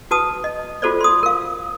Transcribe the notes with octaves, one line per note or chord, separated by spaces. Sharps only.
F#4 B4 A5 D#6
D#5
F4 F#4 A4 C5 D5
C6 D#6
A#4 F5